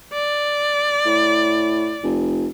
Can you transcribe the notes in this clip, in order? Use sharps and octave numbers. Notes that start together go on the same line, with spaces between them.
D5
A2
F1